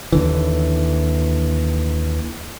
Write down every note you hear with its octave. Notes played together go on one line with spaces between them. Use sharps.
D#2 D3 E3